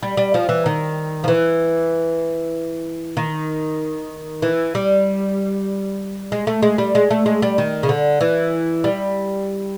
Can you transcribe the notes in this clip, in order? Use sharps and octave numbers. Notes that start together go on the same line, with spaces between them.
G3
G3
F3
E3
D#3
F3
E3
D#3
E3
G3
G#3
A3
G#3
G3
G#3
A3
G#3
G3
D#3
C#3
D3
E3
G3